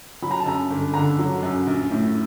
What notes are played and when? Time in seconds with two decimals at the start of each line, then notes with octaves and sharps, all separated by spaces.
0.22 F#3 B5
0.31 A#5
0.40 A5
0.46 F#2 A#5
0.70 G1
0.94 D3 A#5
1.18 F#3
1.43 F#2
1.67 A#1
1.91 A2